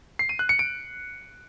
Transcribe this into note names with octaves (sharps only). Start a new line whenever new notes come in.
C7
D#7
F#6
C#7
D7